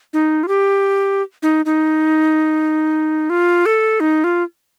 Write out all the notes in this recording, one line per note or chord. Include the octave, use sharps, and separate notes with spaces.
D#4
F4
G4
D#4
D#4
F4
A4
D#4
F4